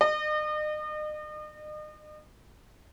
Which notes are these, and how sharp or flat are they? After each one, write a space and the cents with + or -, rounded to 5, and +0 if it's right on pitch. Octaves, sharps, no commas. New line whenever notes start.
D#5 -40